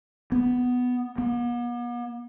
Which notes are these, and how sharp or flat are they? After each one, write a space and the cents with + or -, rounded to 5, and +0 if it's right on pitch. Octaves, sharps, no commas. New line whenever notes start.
B3 +5
B3 -45